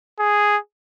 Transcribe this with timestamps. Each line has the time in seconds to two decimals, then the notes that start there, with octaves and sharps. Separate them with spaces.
0.19 G#4